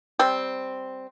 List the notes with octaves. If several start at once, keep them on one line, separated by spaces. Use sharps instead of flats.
G3 C4